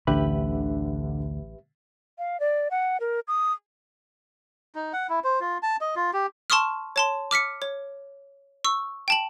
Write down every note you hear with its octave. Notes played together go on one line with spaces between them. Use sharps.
A1 D2 D3 G4 B4 E5 F#7
F5
D5
F#5
A#4
D#6
D#4
F#5
E4
C5
F4
A5
D#5
F4
G4
A5 C6 C#6 D#6 F6
C#5 A5 C6
D6 F6 B6 C#7
C#5
C#6 E6
G5 A5 F#7